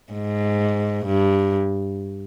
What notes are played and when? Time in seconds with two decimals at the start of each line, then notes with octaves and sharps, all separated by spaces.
0.13 G#2
1.06 G2